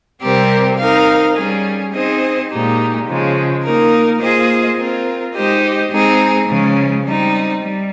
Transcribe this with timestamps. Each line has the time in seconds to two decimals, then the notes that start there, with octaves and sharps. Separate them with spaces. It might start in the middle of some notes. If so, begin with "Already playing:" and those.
0.22 C3 G3 C4 G4 A#4
0.79 C4 D#4 A#4 F5
1.36 G3 C#4 G#4
1.93 C4 D#4 G#4 C5 D#5
2.50 A#2 G#3 D#4 G4
3.07 C#3 F3 G#3
3.63 A#3 D#4 A#4
4.20 A#3 F4 G#4 C5 D#5
4.77 C4 F4 A#4
5.34 G#3 D#4 G4 C5 D#5
5.91 G#3 C4 D#4 G#4
6.48 C#3 F3 G#3 C#4
7.05 G3 C4 D#4
7.62 G3